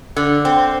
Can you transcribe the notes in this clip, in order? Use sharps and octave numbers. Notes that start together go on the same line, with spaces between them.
D3
C4